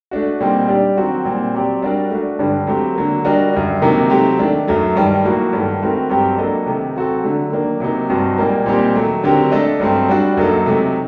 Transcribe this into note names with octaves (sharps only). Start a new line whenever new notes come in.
A3 D4 F#4
A#2 G3 C4 D#4
G3 D4 G4 D5
D#3 F#3 C4 F#4
A#2 G3 C4
F#3 C4 G4 D5
G3 D4 F#4 A#4 D5
A3 D4 F#4
G2 D3 G3
F#3 A3 C4 G4
D3 F#3 A#3
G3 D4 F#4 A#4 D#5
F#2 D3 G3
C3 D#3 F#3 A#3 D#4
F#3 A3 C4 G4
D#3 A3 D4
F#2 F#3 A3
G2 D#3 G3
A2 F#3 A#3 F#4
G2 D#3 A3
D#3 A3 C4 F#4 A#4
G2 F#3 C4 G4
F#3 A#3 D4 A4 D#5
C3 D#3 A3 D#4
F#3 C4 F#4 A4
D3 F#3 A3
D#3 F#3 A#3 D4
C3 F#3 A#3 D#4
G2 F#3 C4 D#4 F#4
A#2 G3 A#3 D#4
A#2 G3 C4 D#4 G4
D#3 F#3 A3
D3 F#3 C4 G4 A#4
A3 D4 A4 D#5
G2 F#3 A3 C4
G3 D4 F#4
F#2 F#3 A#3 D#4 A4
C3 F#3 A3 D#4